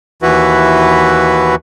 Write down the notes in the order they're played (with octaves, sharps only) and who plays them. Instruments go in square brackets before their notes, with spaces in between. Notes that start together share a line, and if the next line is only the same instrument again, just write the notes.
[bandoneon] D#2 E3 E4 F#4 B4